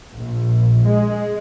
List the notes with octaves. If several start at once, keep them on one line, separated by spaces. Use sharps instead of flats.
A#1
G#3